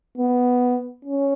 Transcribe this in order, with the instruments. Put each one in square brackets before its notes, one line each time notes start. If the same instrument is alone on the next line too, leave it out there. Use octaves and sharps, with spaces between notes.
[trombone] B3
C#4